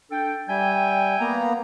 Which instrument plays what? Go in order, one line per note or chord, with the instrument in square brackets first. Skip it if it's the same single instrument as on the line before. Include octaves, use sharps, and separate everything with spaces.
[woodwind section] D4 A4 G5
[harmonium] G3 [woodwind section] E5 G5 G#5
[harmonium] A#3 B3 A#5